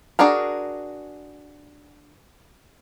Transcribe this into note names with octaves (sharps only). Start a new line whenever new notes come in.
D4 F#4 G#4 A#4